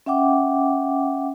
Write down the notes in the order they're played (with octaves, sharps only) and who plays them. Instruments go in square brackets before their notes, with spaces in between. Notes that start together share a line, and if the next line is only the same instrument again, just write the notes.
[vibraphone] C#4 E5 F#5 G5 D6